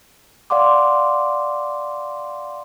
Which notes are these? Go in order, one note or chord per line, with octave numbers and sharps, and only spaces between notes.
D5 F5 F#5 C6 D6